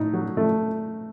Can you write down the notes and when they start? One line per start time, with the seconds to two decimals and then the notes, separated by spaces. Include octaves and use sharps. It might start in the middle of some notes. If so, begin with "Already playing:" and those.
Already playing: A2 D#4
0.14 F#3
0.37 A3